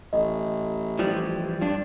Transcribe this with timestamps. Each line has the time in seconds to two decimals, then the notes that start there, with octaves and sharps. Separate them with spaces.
0.13 A1 D#5
0.99 E3 F3 G3
1.61 G2 D4